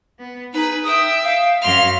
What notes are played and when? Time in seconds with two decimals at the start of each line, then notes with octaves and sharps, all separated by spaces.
0.18 B3
0.53 D#4 G#4 B4
0.85 E5 G5 D#6
1.24 F5
1.61 F#2 C6 F6